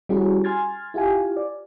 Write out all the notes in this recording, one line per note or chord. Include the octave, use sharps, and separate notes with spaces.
G3 C#4 E4 F#4 G#4
G#5 C6 F6 G#6 A6
E4 F4 G4 F5 G#5
D5